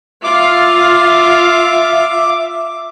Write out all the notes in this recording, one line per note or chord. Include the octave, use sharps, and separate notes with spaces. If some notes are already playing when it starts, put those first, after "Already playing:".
F4 E5 F5 D6